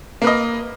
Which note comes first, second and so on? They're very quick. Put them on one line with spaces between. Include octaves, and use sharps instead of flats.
A#3 B4 D#5